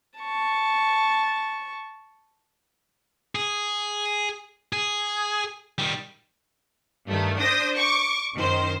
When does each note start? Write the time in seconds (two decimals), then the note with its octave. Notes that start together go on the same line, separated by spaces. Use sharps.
0.20 A5 C#6
3.35 G#4
4.73 G#4
5.79 D#3 G3
7.07 G2 D#3 A3
7.38 D4 C5 D#6 A#6
7.76 C#6 D6
8.35 F#2 D#3 C5